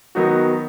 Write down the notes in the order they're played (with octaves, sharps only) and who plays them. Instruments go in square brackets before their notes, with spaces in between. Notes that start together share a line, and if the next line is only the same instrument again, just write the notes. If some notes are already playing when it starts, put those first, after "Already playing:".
[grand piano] D#3 F#3 B3 D#4 F#4